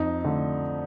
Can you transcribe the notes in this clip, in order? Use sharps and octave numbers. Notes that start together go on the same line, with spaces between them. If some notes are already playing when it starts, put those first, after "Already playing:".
Already playing: F2 D#4
D3 A3